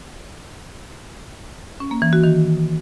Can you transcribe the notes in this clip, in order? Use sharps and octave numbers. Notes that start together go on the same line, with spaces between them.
C#4
A#3
E3
F#4
D#3